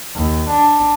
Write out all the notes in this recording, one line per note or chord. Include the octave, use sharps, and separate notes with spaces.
D#2
D4